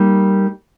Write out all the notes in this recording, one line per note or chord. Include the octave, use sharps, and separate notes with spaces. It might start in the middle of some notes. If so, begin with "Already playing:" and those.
Already playing: G3 A#3 D#4